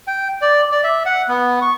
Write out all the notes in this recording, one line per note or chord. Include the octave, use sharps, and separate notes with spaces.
G5
D5
D5
E5
F#5
B3
C#6